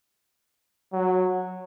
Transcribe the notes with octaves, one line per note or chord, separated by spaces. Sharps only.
F#3